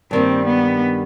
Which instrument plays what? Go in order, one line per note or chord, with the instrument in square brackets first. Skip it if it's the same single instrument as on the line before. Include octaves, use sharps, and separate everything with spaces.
[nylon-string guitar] G2 D#3 G3 A#3 [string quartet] C4
[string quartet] B3